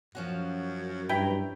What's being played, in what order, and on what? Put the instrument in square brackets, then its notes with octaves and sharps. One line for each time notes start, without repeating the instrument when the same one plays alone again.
[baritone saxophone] F#2 [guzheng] F3 C#4 F#4
[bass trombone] G2 [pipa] E4 B4 G5 [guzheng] A#5